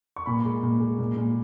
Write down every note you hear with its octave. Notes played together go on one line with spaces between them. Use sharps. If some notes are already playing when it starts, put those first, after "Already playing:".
C#6
A#2 B5
G#3
A#2
G#3
A#2
A#2